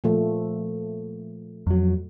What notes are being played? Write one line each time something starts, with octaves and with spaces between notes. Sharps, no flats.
A#2 F3 A3
F2 F#3